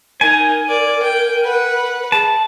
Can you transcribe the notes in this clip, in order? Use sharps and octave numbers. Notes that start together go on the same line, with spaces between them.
D#4 A#4 G#5
D5
G5
B4 F#5
G#4 A5